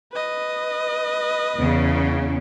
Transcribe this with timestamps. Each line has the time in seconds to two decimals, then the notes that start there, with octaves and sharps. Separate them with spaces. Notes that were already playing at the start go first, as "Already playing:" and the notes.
0.12 B4 D#5
1.57 E2 C#3